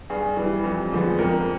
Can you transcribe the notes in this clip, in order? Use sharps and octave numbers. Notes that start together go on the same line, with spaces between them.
G2 G#4
E3 G3
F2
D3 F3 G#3 B3
F2 A#4